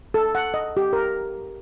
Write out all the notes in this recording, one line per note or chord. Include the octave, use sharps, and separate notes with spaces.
A4
F#5
D#5
G4
A#4